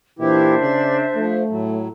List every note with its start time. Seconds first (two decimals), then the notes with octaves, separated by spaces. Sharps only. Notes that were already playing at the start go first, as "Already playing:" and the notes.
0.19 A#2 E3 D4 E4 G4 C5 E5
0.61 C#3 D5
1.16 F3 A3
1.49 A2 F#3